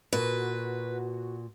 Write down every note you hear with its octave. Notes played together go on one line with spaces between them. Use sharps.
A#2 F#4 B4